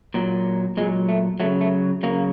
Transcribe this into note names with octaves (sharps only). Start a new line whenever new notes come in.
A#2 F#3
A#2 F#3 G#3
A3
C#3 F#3 A3
A3
C#3 F#3 A#3